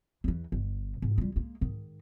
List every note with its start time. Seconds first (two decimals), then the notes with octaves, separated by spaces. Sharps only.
0.24 E2 E3
0.52 G1
1.02 G#2
1.18 G3 F4
1.36 G#3 A#3
1.61 G#2 D#3